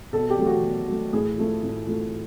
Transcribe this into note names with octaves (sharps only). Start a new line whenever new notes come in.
B2 A4
G4
F#3 A3
F#4
B2
F#3 A3
A2 G#4
F3 A3
A2
F3 A3